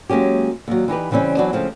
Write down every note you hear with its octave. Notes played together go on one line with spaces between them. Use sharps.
F#3 G#3 A#3 C#4 G4
D#2 F#3
E3 D#4 G4 B4
C#3 E3 G3 C4 C#4
E3 F#3 B3 C4 D4
C#3 F3 G#3 A3 C4